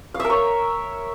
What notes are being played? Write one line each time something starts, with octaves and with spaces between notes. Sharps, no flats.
F5
E5
A#4
C#5